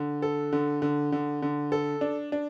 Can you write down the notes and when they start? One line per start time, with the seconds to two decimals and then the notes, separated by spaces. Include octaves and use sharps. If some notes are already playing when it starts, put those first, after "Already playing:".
Already playing: D3
0.22 A4
0.53 D3
0.82 D3
1.12 D3
1.42 D3
1.72 A4
2.01 D4
2.32 D4